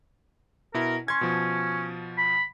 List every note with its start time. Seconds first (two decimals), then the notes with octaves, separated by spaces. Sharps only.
0.74 B2 E4 A#4
1.08 C#4 C6 G#6
1.21 B2 F3
2.18 B5